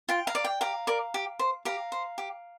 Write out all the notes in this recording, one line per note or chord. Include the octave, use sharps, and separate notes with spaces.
F4 G5
F5 A#5
D5
G5
G4 F5 A#5
A#4 D5
G4
C5
G4 F5 A#5
C5
G4